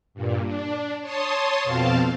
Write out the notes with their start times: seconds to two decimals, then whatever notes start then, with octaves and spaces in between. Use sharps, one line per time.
0.14 G2 A#2
0.45 D4
1.01 C#5 A5 C6 D#6
1.64 F2 B2 C4 F5 A5